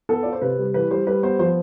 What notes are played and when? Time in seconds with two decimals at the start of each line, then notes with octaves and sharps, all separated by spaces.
0.09 B3 A4
0.23 F4 D5
0.32 C5
0.42 C3 B4
0.58 G3
0.74 E3 B4
0.91 G3 C5
1.07 G3 B4
1.23 B3 C5
1.39 F3 C5